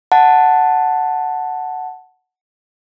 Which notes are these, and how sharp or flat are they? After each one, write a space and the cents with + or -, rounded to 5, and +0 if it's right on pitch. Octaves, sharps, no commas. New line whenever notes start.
F#5 +0 A5 +0